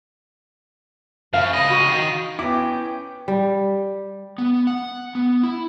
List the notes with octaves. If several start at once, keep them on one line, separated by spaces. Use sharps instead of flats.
F#2 F5
C#3 D#5 B5 A#6 D#7
F#4
D#3 D7
B3 C#4 E4 G5 D6
G3
B3
F#5
B3
E4